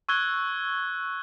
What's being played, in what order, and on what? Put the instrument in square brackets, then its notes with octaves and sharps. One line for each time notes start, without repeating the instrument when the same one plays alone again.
[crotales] C#6 E6 F#6 G#6 G7